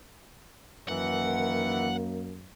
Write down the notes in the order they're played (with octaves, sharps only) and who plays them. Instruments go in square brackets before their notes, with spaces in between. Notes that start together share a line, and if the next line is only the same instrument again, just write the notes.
[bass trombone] F#2 [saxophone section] D#3 E3 [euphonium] A#3 [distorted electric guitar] F#5